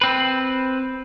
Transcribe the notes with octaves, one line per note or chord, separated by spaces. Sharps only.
C4 B4